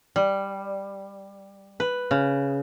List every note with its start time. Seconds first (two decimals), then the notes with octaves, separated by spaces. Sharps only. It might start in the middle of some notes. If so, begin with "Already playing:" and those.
0.16 G3
1.80 B4
2.11 C#3